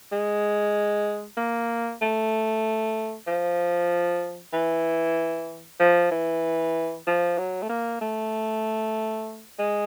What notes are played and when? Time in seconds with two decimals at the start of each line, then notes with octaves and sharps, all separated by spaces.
0.12 G#3
1.37 A#3
2.02 A3
3.27 F3
4.53 E3
5.80 F3
6.11 E3
7.07 F3
7.38 F#3
7.62 A3
7.69 A#3
8.01 A3
9.59 G#3